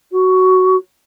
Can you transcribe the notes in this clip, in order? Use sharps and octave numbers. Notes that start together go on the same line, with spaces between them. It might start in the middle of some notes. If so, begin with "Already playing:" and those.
F#4